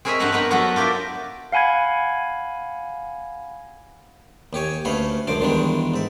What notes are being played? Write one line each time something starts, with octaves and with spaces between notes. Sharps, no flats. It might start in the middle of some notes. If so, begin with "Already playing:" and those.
C4 G#4 A#4 C#5 D#5 E5
G2 C#5 E5 F#5 A#5 B5
B3 D#4 A#4 B5
F#3 B3 F#4 A4 A#4
F4 G4 A#4 D5 E5
F5 F#5 G#5 B5 G#6
D#2 G4 C#5 G#5
D2 A3 C#4 B4 F5 F#5
C#2 F#2 D3 C5 D6
E2 D3 D#3 G3 G#3 D4
G#2 E5